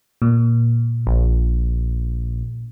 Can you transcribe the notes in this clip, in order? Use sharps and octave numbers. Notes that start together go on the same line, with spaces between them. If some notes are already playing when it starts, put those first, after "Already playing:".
A#2
A#1